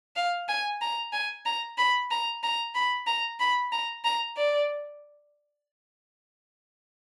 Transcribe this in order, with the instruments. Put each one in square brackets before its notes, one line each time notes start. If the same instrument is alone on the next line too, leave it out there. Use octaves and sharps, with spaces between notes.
[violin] F5
G#5
A#5
G#5
A#5
B5
A#5
A#5
B5
A#5
B5
A#5
A#5
D5